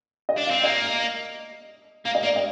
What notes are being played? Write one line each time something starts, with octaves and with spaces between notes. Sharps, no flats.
D#5
D4
C4 F5
A#3 D#5
A#3 F5
D#5
A#3
D5
D#5